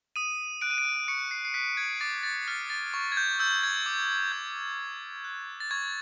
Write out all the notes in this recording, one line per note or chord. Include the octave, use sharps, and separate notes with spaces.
D#6 D#7
F#6 D7
D#7
D7
C#6 C#7
C7
C7
F#6 B6
G#6
D6 A6
A6
F6 A6
A6
C#6
G#6
G6
E6 G6
G#6
D6
G6
D6
F#6
A6
C#6 G#6